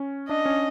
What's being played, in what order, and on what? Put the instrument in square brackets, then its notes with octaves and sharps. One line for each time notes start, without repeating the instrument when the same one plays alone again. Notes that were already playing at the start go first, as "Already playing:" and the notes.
Already playing: [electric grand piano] C#4
[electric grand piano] D4 [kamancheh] D#5
[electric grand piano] C#4